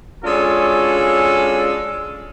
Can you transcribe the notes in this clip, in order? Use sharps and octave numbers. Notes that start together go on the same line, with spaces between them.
G#3 C#4 D4 F4 F#4 A4